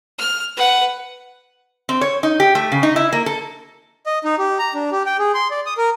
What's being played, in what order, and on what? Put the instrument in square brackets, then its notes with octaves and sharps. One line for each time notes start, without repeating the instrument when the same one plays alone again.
[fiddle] F6
B4 F#5
[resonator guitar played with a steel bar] C4
C#5
D#4
G4
A3
C#3
D#4
E4
A#3
A4
[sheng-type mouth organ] D#5
D#4
G4
A#5
D4
G4
G5
G#4
C6
D5
D#6
A#4